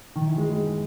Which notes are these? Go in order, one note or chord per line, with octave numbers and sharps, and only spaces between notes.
D#3
E3
G#3
G#3